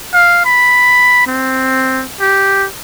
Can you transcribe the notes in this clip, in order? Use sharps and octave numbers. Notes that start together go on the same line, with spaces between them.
F5
B5
C4
G4